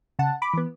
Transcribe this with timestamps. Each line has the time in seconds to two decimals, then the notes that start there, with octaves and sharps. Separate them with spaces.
0.19 C#3 F#5 A5
0.42 B5 D6
0.54 E3 B3